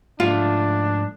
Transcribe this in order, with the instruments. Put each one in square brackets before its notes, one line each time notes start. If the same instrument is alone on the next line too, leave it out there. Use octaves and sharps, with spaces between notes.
[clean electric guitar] G#2 F3 A3 [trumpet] D4 [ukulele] F4